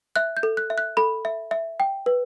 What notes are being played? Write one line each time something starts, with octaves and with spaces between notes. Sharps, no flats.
E5 F#6
G6
A4
F#6
E5
F#6
A4 B5
E5
E5
G5
B4